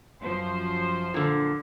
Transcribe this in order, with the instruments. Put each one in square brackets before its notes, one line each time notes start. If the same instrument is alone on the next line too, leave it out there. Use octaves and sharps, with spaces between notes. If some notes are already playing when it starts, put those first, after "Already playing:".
[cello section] F#2 F3 C5
[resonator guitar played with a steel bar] A#2 D3